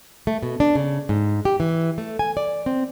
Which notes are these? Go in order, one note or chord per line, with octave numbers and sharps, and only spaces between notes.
A3
B2
D4
C#3
G#2
G4
E3
A3
G#5
D5
C4